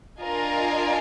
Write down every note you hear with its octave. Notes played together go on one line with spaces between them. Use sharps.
D4 F4 A#4 D#5 G#5